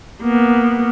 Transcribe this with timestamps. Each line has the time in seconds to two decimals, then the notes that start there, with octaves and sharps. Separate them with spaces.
0.22 A#3 B3